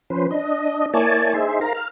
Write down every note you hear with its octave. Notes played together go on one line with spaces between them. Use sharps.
F3 C#4 B4 C5
D4 D#5
A#3 E4 C#5 D5 G#5 A5
D#4 G#4 C5 E5
A#4 F5 A#5
F6